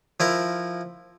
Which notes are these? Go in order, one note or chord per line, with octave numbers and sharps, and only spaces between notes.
F3 E4 A#4